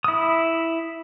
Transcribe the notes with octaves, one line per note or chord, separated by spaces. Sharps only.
E4 D#6